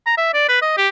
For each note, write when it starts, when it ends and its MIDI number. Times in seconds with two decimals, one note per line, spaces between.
0.06 0.16 82
0.17 0.31 76
0.34 0.47 74
0.49 0.59 71
0.62 0.77 75
0.77 0.88 67